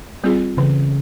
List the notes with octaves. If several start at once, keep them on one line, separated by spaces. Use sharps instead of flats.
G3 C4 F4 G#4
C#3 E3